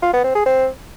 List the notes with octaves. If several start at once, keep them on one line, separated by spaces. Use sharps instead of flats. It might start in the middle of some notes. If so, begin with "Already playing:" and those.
F4
B3
C4
G#4
C4